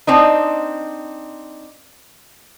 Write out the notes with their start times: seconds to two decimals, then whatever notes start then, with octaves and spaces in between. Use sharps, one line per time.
0.07 C4 D4 D#4